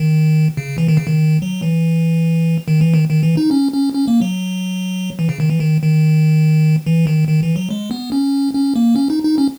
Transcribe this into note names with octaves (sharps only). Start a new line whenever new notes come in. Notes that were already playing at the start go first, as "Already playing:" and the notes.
Already playing: D#3
C#3
E3
D#3
C#3
D#3
F#3
E3
D#3
E3
D#3
D#3
E3
D#4
C#4
C#4
C#4
A#3
F#3
E3
C#3
D#3
E3
D#3
D#3
E3
D#3
D#3
E3
F#3
G#3
B3
C#4
C#4
A#3
C#4
D#4
D#4
C#4